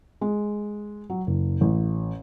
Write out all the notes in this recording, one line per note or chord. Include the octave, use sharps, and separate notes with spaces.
G#3
F#3
F#1
A1